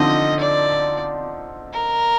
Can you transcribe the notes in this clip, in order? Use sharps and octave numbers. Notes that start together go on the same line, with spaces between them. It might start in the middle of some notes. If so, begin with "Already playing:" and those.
Already playing: D3 F3 C4 D#4 D#5
D5
A#4